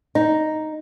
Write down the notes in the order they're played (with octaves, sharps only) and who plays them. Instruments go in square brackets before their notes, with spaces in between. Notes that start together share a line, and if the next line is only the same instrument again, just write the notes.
[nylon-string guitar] D#4